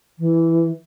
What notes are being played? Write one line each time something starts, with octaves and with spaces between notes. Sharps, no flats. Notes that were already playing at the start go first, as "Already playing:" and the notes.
E3